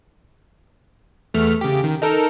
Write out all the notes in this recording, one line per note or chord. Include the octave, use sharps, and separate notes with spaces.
E2 A3 F6
C#3 G4
D#3
D#4 A4 A#4